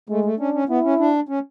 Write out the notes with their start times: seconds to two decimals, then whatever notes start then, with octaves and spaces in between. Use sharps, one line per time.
0.09 G#3 A3
0.25 A3
0.39 C#4 D4
0.54 C#4
0.69 B3 E4
0.84 C#4
0.99 D4
1.29 C#4